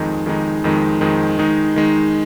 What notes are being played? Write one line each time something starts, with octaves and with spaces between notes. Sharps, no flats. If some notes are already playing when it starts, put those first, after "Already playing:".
Already playing: F2 D#3 G#3 D#4
F2 D#3 G#3 D#4
F2 D#3 G#3 D#4
F2 D#3 G#3 D#4
D#3 G#3 D#4
D#3 G#3 D#4